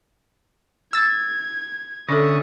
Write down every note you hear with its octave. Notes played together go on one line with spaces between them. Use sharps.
E6 G#6 A6
D3 C#4 D4 A4 E5 D#6